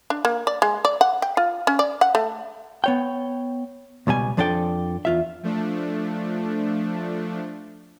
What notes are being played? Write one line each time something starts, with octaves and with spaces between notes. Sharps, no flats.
D4
A#3
D5
G#3
D5
F#5
G5
F4
C#4
D5
F#5
A3
B3 C#5 G5
C#2 B2 G3 G#5
F2 F3 D4 A4 D5 G5
E2 F4 E5
F3 A3 D4